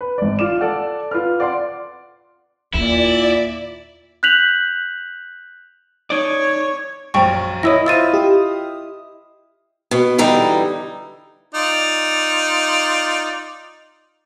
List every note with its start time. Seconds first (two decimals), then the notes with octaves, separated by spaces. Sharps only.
0.01 B4
0.18 G#1 D5
0.39 F4 D6 E7
0.61 A4 D5 F#5
1.11 F4 B4 F6
1.40 D5 F#5 C6 D6
2.74 D#2 A#2 E4 D5
4.23 F#6 G6 B6 F7 F#7
6.10 D#4 C#5 D5
7.14 A#1 F#2 G5 A#5 C#6
7.63 E4 C#5 D#5 E6 A#6
7.86 F4 C5 E5 E6 A6 D#7
8.11 G4 D#6
9.91 B2
10.18 D3 E3 G3 D#4
11.54 D#4 F4 D5